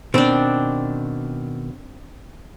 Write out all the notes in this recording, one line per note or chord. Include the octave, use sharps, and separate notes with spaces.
B2 D#3 C4 D4